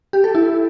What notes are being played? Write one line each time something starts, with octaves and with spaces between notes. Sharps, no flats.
G4
A4
E4